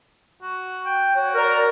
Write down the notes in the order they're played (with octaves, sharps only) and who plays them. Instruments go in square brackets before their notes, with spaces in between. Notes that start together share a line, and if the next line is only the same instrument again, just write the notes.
[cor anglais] F#4
G5
[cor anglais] F#4 [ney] C#5
[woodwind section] A#4 [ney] D5